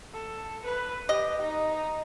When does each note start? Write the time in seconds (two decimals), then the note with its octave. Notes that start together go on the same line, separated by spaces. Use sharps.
0.14 A4
0.65 B4
1.09 G4 D#5
1.42 D#4